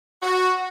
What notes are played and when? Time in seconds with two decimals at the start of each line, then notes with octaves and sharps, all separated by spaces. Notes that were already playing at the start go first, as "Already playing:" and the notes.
0.22 F#4